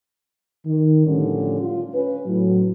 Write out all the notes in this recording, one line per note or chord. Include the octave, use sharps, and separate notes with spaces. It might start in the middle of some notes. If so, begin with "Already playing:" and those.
D#3
A2 D3 F3 G3 C#4
F4
C#4 B4
A2 F#3